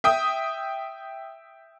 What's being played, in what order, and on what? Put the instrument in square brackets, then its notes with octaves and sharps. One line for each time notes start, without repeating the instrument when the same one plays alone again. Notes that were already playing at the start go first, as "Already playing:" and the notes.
[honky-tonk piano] E5 G5 D#6